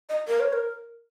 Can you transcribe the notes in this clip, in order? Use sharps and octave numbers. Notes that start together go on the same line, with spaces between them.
D#5
A#4
C#5
A#4